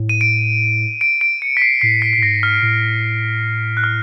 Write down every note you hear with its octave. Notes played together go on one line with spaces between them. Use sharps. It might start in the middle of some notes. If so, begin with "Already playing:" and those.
Already playing: A2
D#7
D7
D7
D7
C#7
B6
C7
A2 C7
B6
B6
A2
G#2 A#6
F6
A2
F#6
F6